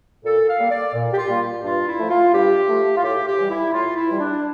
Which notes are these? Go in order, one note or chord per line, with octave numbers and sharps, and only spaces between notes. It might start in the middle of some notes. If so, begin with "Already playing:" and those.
A#2 A4
F5
G3 A#3
D5
A#2
G4
F4
G3 A#3
G2 F4
E4
F3 A3
F4
G2 G4
F3 A3
F4
A2 G4
G4
E3 G3
E4
A2 F4
E4
E3 G3
D4